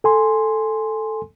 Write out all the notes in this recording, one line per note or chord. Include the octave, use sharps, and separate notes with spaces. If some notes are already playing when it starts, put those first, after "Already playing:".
A4 G#5 C6